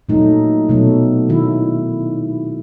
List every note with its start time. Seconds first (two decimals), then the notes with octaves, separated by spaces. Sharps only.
0.09 A#2 F#3 A3 D#4
0.69 B2 F#3 A3
1.29 D#3 E4